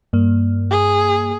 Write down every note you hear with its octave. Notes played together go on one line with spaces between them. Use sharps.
G2 A#3
G#4